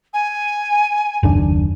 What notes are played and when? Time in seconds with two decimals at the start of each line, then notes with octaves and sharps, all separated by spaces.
0.14 G#5
1.23 F#1 D#2 D4